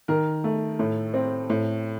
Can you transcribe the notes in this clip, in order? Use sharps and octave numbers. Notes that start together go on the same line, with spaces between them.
D#3 A#4
A3
A2
C4
A2